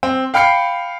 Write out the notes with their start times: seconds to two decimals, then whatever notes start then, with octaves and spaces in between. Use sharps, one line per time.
0.03 C4
0.34 F5 G5 B5 F6 C7 C#7